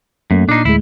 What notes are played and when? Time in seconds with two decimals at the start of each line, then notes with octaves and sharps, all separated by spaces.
0.31 F#2 A3 A#3
0.49 A#2 D4 D#4 C7
0.65 D2 A2 G#3 E4